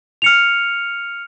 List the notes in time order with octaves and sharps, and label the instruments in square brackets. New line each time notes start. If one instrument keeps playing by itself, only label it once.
[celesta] F6 C#7 F7